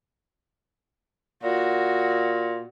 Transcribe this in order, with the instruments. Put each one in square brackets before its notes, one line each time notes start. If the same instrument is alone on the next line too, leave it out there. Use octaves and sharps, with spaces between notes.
[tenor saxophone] A#2 [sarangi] F#4